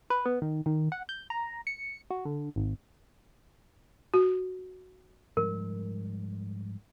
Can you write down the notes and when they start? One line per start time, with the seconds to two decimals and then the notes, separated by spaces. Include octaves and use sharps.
0.10 B4
0.26 B3
0.42 D#3
0.66 D#3
0.92 F#5
1.09 G6
1.30 A#5
1.67 C#7
2.10 F#4
2.25 D3
2.56 G#1
4.14 F#4
5.37 G#2 F3 G3 A#4